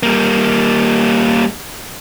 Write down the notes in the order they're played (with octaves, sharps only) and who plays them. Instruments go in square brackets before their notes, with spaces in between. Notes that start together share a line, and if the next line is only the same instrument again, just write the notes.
[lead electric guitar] G3 A#3